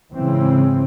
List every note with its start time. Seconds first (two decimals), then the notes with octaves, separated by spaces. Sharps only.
0.17 G#2 C#3 E3 C4